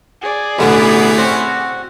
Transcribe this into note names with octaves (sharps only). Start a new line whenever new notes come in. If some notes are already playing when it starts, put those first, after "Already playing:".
G#4 D5
A1 B2 D3 E3 A3 B3 C#4 E4
C4 F#4